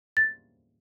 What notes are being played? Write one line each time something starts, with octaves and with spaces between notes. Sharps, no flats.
A6